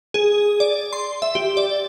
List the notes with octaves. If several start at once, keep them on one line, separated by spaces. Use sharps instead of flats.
G#4
D5
C6
E5
G4
D5